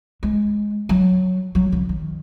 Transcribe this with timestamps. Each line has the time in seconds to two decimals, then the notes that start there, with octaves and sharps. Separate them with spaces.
0.23 G#3
0.89 F#3
1.55 F#3
1.72 C#3
1.89 D#3